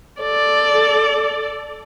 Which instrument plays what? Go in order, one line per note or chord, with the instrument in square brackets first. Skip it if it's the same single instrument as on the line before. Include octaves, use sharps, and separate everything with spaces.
[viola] A4 D5